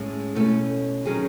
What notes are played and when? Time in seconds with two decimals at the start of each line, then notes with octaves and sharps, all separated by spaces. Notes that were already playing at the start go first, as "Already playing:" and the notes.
Already playing: A2 G#3 C#4
0.35 B2 A3 C#4
1.06 D#3 F#3 C#4 G#4